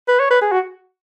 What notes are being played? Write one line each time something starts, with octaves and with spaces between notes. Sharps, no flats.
B4
C#5
B4
G#4
F#4